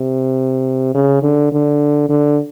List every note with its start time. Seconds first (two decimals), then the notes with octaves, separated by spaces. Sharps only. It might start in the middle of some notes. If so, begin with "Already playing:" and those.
Already playing: C3
0.95 C#3
1.22 D3
1.52 D3
2.09 D3